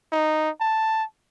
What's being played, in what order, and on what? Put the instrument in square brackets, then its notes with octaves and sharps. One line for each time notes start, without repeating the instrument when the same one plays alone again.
[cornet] D#4
A5